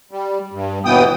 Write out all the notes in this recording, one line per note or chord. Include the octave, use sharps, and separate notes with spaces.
G3
G2
D#2 B2 E3 B3 G5 D#6